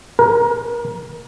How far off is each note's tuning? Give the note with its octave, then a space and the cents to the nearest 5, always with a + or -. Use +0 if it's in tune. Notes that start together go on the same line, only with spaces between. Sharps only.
A#4 +25